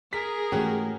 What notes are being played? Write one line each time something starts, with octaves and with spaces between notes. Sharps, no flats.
G#4 A#4 B6
G#2 E3 A3 C#4 F#4 G4